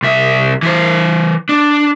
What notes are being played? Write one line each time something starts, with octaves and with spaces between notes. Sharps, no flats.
C2 E5
E3 C5
D4